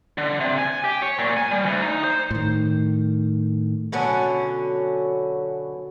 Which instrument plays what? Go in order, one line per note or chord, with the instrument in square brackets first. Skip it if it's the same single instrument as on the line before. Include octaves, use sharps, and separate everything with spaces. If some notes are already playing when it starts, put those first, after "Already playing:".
[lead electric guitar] D3
C3
G#5
G4
C#5
A#2
G#5
G3
D2
D#4
C5
[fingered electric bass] A2 D#3
[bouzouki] B2 D3 F#3 C#4